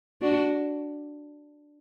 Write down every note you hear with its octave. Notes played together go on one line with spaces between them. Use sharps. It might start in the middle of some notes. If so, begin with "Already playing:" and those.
D4 F#4